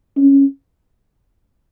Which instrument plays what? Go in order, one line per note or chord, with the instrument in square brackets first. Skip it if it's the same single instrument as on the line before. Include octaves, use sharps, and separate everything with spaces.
[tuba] C#4